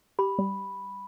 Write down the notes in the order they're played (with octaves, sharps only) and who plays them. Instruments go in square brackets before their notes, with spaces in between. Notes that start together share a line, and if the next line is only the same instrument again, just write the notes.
[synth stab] G4 [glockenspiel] B5
[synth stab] G3